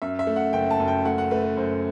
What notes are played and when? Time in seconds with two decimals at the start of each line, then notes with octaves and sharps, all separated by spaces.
0.02 F#2 E5
0.19 E5
0.27 A3
0.36 F#5
0.53 F#1 G5
0.71 A5
0.80 F#2
0.88 G5
1.05 A3 F#5
1.18 F#5
1.31 A3 B4
1.43 B4
1.57 F#2 C5